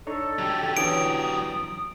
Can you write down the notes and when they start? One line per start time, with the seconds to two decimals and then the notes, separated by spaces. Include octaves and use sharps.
0.07 D4 D#4 A4 C#5
0.39 F#3 G4
0.77 D3 E3 C#4 D#6 D7